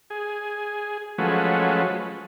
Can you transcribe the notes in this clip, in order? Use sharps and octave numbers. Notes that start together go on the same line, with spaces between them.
G#4
F3 F#3 G#3 A3 C#4 B4